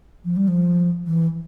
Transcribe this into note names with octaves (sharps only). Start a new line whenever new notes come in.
F3
G3
F3
E3